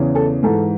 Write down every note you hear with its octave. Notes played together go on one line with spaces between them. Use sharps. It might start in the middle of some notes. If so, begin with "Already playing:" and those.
Already playing: E2 C#3 E3
A4
G#2 E3 A4